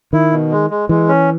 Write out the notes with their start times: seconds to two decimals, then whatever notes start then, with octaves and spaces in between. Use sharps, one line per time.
0.13 D#3 E4
0.32 B2
0.52 G#3
0.70 G#3
0.89 E3 G#3
1.08 C#4